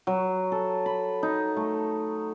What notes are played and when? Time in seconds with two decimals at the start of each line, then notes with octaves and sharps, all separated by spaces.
0.07 F#3
0.52 A4
0.86 B5
1.23 D#4
1.56 A3